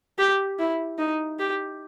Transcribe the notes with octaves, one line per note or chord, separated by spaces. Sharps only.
G4
E4
D#4
G4